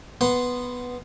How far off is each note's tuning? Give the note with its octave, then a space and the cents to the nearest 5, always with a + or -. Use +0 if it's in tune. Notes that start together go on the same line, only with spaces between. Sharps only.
B3 +0 F#5 +0 C6 -5